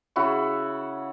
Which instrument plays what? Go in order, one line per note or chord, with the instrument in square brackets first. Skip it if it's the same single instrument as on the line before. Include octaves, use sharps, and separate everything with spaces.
[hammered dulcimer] C#3 E4 F#4 C#6